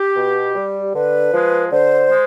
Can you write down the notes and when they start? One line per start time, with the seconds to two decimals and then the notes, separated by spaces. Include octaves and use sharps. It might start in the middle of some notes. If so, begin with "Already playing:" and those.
Already playing: G4
0.17 B2
0.55 G3
0.94 D3 B4
1.33 F3 G#3
1.71 D3 C5
2.10 G#3